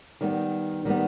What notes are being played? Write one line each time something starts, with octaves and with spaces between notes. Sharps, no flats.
D#3 G3 B3
D#3 G3 B3